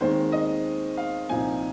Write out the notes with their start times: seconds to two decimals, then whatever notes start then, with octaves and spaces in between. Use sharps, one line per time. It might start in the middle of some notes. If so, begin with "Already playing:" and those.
0.01 D#2 D#3 G#3 C4 C5
0.32 D#5
0.97 F5
1.29 C2 A#2 F3 C4 D#4 G#5